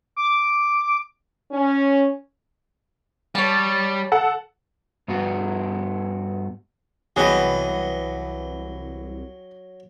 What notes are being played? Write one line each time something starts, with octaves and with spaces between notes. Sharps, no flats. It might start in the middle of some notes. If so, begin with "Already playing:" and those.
D6
C#4
G3 C#5 A5
A4 F#5
G2 B3 F#4
C2 E3 F#3 B3 G4 G#4 D#5